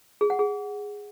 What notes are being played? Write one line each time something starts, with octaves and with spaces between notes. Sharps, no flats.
G#4
F#5
G#4